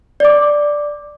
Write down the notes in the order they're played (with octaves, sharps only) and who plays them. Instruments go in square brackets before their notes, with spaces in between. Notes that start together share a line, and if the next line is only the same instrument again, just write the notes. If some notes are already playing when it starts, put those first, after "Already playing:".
[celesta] D5 D6